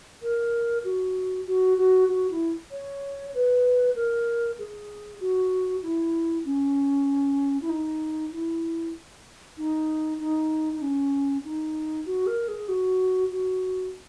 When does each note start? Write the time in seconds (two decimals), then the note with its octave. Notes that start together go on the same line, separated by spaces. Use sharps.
0.23 A#4
0.84 F#4
1.47 F#4
1.78 F#4
2.08 F#4
2.30 E4
2.71 C#5
3.34 B4
3.95 A#4
4.59 G#4
5.20 F#4
5.82 E4
6.45 C#4
7.62 E4
7.69 D#4
8.32 E4
9.58 D#4
10.20 D#4
10.73 D#4
10.82 C#4
11.45 D#4
12.06 F#4
12.27 A#4
12.48 G#4
12.69 F#4
13.31 F#4